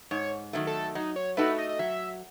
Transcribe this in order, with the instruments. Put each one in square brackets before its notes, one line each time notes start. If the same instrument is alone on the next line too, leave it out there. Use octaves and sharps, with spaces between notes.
[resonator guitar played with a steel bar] G#2 [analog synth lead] C#5
[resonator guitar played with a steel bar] D#3 F#3 A3
[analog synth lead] A4
[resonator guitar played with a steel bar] F#3 [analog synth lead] D#4
[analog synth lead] C#5
[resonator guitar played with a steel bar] A3 D#4 F#4 A4 [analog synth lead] B4
[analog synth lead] D#5
D#5
[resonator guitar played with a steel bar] F#3 [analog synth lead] E5